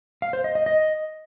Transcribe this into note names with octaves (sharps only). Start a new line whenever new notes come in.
F5
C5
D#5
D#5
D#5